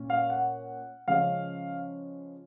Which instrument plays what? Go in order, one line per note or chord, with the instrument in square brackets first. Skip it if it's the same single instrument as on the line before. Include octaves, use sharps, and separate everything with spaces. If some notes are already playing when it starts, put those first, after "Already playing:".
Already playing: [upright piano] A#2 C#4
F5
F#5
C#3 F3 G#3 C#4 F5